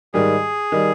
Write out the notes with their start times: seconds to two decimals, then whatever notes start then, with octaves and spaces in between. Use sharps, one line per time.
0.14 G#2 D#3 G3 G#4
0.72 D#3 G3